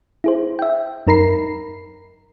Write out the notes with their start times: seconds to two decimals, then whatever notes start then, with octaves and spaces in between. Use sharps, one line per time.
0.24 E4 G#4 C5
0.59 E5 G5
1.07 F#2 D#4 A#4 A#5 B5 C7